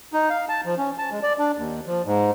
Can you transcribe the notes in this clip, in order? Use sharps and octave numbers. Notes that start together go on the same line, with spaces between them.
D#4
F5
A5
F3
C#4
A5
G#3
D5
D4
D#2
F3
G#2